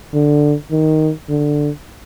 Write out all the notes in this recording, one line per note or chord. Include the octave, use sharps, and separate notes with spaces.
D3
D#3
D3